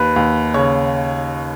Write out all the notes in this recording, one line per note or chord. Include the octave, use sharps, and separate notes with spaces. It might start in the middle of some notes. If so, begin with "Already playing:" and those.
Already playing: D#2 B4
D#2
C#3 C#5